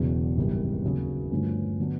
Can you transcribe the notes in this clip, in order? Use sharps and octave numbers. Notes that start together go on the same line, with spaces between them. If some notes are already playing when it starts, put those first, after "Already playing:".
Already playing: E1 E2 C#3 F#3
G#1 F#2 C#3 E3 G3
D#2 C#3 F#3
G2 D3 F3 A3 C#4
D3 F#3 B3 D4